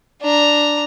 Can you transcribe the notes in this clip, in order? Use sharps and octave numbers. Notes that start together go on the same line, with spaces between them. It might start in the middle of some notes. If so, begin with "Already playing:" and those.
D4 A#5